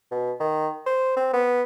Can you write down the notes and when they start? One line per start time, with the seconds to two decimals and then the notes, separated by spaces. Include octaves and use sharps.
0.11 B2
0.40 D#3
0.86 C5
1.16 C4
1.33 B3